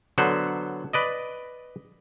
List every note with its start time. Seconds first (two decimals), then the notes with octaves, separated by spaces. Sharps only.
0.18 D3 F#3 B3 C5 F#5
0.93 B4 D5 D#5